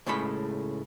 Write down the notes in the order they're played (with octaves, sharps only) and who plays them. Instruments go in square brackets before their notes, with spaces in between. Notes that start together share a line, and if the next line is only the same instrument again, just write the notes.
[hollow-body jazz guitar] C#2 A2 C#3 G#3 A3 B5